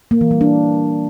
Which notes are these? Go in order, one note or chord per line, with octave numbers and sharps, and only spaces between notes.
A#3
E3
G3
D4